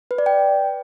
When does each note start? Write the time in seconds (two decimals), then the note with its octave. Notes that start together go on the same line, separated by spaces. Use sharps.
0.11 B4
0.18 D5
0.26 G5